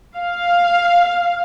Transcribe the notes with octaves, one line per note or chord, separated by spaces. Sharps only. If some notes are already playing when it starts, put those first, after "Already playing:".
F5